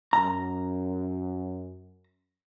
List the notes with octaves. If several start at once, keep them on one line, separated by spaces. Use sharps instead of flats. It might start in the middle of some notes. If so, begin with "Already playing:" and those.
F#2 A#5